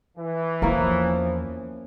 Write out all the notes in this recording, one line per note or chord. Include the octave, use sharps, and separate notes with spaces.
E3
E2 F3 A#3 C#4 E4